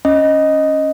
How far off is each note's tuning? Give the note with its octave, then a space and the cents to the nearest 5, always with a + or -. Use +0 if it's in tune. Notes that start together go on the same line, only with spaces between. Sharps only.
C#4 +0 D#5 +0